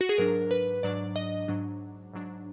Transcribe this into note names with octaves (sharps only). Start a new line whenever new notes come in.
F#4
G#4
G#2 F#3 D4 A#4
B4
G#2 F#3 D4 D5
D#5
G#2 F#3 D4
G#2 F#3 D4